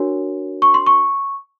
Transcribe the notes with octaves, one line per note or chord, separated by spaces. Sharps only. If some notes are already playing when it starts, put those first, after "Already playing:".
Already playing: D4 F#4 A#4 C#5
C#6
C6
C#6